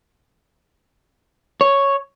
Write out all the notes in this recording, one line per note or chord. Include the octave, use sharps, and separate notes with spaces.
C#5